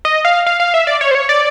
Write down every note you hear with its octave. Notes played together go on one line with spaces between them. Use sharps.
D#5
F5
F5
F5
E5
D5
C#5
C5
C#5
D5